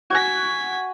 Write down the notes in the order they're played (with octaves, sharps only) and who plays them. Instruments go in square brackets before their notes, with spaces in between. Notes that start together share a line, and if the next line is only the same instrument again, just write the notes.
[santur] F#4 F#5 G#5 [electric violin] G#6 B6